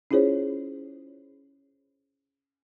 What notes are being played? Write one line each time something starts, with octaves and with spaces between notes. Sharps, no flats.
C#4 E4 F4 G#4 C5 C#5